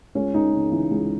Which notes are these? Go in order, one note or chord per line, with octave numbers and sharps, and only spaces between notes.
C#2 C#4
C#2 D#4
C#3
E3
C#2